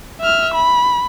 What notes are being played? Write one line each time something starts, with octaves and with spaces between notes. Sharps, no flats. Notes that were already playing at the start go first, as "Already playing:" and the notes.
E5 F6
B5